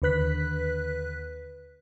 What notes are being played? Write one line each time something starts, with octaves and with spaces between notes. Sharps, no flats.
D#2 D3 B4 F#6 B6